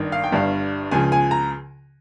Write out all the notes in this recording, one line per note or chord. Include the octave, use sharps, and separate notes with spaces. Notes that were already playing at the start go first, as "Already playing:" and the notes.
Already playing: G#1 G2 D#3
F5
G5
G1 G2 G3 F5
C#2 C#3 F3 G#5
G#5
A#5